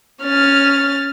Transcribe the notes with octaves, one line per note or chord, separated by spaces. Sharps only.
C#4 F6 A6